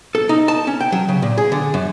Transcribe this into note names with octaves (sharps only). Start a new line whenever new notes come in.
A4
D#4
A5
C#4
G5
F#3
C#3
A#2
G#4
D3
F#2